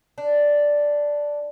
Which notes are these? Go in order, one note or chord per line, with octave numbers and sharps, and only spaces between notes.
D4